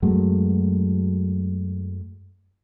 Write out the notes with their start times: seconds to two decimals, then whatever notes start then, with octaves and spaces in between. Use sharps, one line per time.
0.02 F#2 F#3 G#3 A3